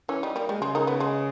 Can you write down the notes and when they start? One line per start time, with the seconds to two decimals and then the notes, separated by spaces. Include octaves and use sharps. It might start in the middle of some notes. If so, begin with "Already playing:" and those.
0.09 E3 C#4
0.23 G3 D#4
0.36 G3 A#3
0.49 G3 G#3
0.62 C#3 G#3
0.75 D#3 D#4
0.87 B3
1.00 G#3